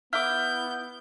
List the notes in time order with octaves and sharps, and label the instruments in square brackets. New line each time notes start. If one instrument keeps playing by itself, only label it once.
[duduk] B3 [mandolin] E4 D6 [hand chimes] F6 [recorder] G6